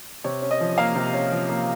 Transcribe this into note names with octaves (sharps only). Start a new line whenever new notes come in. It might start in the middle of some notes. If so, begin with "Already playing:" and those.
C3 C#5
C#4
D#5
F3
A#3 F5
C3
C#4
F3
A#3